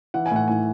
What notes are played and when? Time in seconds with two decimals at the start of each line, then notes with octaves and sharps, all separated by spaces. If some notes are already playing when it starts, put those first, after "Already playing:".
0.14 E3 F#5
0.26 G#5
0.31 A2 F#5
0.48 A2 G#5